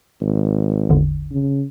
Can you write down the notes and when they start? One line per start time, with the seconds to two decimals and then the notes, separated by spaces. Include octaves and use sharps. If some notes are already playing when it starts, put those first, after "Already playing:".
0.21 G#1
0.90 A1 E2 D3
1.31 C#3